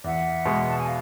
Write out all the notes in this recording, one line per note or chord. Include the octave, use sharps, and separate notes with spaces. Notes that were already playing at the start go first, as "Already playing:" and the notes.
E2 E5 F#5
B2 G#3
A5
G#5
F5